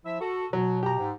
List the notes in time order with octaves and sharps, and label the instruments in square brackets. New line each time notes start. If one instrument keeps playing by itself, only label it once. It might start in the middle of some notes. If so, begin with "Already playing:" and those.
[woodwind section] F3 E4 E5
F#4 A4
[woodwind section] B2 [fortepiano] F#3
[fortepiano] G4 A#5
[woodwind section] G#2